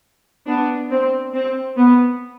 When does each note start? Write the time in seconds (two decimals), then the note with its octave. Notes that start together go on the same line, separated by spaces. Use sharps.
0.47 B3 D4
0.90 C4
1.34 C4
1.77 B3